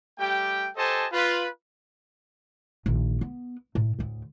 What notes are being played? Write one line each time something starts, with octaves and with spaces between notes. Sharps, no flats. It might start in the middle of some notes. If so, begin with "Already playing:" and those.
G3 A3 G4 G5
G4 A4 C5 D#5 G#5 A5
F4 B4
A#1 D#3
B3
A2
D2 A2